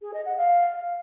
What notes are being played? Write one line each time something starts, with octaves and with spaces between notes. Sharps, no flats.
G#4
D#5
F#5
F5